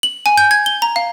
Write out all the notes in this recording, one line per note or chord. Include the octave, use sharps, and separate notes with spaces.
F#7
G#5
G6
G#6
G7
A#5
F5